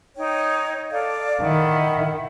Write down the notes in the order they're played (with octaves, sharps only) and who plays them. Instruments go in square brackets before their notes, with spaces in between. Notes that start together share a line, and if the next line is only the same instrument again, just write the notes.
[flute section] D#4 C#5 G5
A4 D5 F5
[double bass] D#3 [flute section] E4 F#5